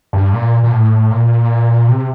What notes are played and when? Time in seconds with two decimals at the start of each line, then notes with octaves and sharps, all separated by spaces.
0.13 G2
0.33 A#2
0.63 A#2
0.71 A2
1.11 A#2
1.88 C3